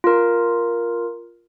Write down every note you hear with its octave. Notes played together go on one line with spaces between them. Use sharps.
F4 A#4